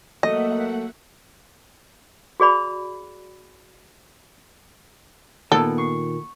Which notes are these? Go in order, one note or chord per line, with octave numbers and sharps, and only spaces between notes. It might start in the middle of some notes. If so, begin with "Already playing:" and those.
F#3 A3 A#3 D#5 E5 F#5
F#4 G#4 D5 B5
A#2 D#3 B3 A4
C#6 C7